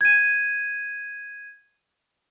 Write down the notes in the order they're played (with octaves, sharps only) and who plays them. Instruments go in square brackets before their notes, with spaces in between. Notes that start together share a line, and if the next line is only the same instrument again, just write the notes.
[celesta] G#6 D#7